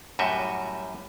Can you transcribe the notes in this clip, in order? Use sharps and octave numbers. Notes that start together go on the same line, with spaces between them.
F#2 A2 G3 F#4 D#5 E5